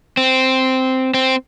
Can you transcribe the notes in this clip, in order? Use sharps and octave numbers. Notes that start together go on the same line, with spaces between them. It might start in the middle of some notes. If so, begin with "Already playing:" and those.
C4
C4